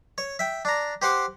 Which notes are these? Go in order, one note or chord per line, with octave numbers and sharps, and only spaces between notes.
C#5
E5 G5
D4 A#5
G4 C5 F#5 C6 D6